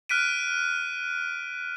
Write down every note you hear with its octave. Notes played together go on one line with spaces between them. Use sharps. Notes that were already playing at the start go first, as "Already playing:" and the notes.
F6 F#6 B6 D7 D#7